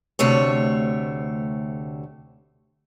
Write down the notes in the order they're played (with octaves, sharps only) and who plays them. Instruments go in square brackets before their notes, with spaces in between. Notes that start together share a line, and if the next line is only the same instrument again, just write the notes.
[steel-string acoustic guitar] D2 C3 A3 C#5